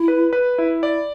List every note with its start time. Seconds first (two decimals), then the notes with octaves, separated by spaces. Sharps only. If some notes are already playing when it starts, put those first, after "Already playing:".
Already playing: E4
0.08 B4
0.33 B4
0.58 E4
0.83 D5